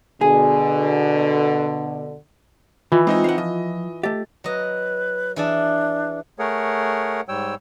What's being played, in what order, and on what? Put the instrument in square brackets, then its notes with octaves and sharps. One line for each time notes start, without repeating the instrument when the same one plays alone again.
[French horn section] B2 D3 [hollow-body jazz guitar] G#4
[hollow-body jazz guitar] D#3 [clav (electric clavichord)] E3 [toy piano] F4
[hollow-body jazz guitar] G#3 [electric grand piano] C4 D#4 D#5
[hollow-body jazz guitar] F5 F#5
[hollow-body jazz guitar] F3 [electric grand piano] D#5
[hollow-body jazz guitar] A3 G4 [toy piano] D#5
[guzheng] F#3 D#5 [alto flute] B4
[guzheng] E3 G#4 A5 [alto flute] D4
[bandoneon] A3 G#4 A#4 C#5 F#5
G#2 G3 C#5 G5 E6